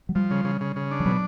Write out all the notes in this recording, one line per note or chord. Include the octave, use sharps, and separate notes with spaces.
F#3
F3 G3
C#3
C#3
C#3
C#3
D4
F3
B2 F#3